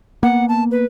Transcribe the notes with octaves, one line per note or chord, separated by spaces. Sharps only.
A#3 B3 F#5
A5
B4